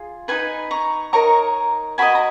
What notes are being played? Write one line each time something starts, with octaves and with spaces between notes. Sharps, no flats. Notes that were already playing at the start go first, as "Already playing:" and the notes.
Already playing: F4 G#4
D#4 G#4 B4 G#5 B5
A#5 C#6
D#4 A#4 C#5 A#5 C#6
F#4 A#4 D#5 G#5 B5
A#5